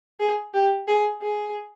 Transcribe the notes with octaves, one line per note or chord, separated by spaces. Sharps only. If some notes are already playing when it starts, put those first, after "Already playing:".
G#4
G4
G#4
G#4